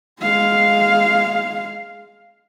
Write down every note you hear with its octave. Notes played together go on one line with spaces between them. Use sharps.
G#3 F5